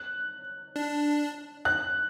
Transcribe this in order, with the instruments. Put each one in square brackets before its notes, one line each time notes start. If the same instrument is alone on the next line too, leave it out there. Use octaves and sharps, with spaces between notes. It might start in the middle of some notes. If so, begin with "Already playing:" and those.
Already playing: [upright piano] F#6
[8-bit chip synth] D4
[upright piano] F#6